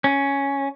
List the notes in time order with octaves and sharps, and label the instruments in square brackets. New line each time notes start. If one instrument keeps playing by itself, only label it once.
[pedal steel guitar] C#4